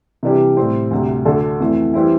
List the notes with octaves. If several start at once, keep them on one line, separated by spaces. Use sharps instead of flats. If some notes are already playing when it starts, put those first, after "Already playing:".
C3 E3 G3 D4 G4
A2 G3 C4
D2 C3 G3
D2 D3 A3 D4 A4
F2 E3 A3 E4
E3 G3 C4 E4